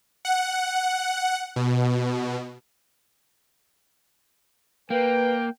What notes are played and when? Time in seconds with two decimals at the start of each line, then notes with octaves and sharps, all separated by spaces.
0.25 F#5
1.56 B2
4.90 A#3 B4 G5